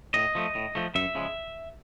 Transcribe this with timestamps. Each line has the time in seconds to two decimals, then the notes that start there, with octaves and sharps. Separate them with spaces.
0.14 A2 D#5
0.35 F3 A3
0.55 A2
0.75 F3 A3
0.95 F#2 E5
1.15 C#3 F3 G#3